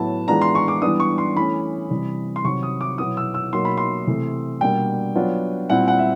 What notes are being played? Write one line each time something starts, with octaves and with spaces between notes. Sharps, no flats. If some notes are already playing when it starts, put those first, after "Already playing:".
Already playing: A2 F#3 B3 E4 A5
E3 G#3 B3 D4 F4 A#5
C6
C#6
D6
E3 G3 B3 D4 D#6
C#6
C6
E3 A3 C#4 B5
C3 E3 G3
C6
C3 D#3 F#3 C#6
D#6
D6
B2 F#3 B3 E4 D#6
E6
E6
B2 F#3 A#3 D#4 C6
B5
C6
C3 E3 A3
B2 G3 A#3 D4 G5
F#3 B3 D4 F4
A#2 G3 C4 E4 F#5
F#5
E5